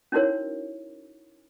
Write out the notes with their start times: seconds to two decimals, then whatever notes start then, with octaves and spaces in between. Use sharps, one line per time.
0.12 C#4 D#4 E4 F#4 A#4 C#5